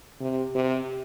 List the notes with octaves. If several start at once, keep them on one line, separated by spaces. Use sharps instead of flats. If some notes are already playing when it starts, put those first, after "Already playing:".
C3
C3